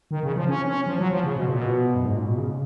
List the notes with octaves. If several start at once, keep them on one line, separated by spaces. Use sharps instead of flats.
D#3
C#3
F3
C#4
C#4
F3
F#3
F3
C#3
B2
A#2
B2
F#2
G#2
A#2
B2
C#3